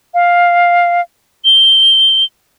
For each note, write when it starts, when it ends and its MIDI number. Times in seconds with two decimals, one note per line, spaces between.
0.14 1.01 77
1.45 2.24 103